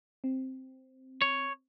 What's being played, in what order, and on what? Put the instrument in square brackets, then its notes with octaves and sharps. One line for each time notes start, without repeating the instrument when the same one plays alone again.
[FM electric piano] C4
[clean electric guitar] C#5